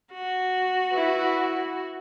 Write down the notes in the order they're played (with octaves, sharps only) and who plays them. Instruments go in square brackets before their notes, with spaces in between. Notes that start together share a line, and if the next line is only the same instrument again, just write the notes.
[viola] F#4
[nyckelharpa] E4 B4